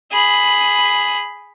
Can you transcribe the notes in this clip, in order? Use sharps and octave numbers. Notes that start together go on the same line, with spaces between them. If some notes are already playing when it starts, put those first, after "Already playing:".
G#4 B5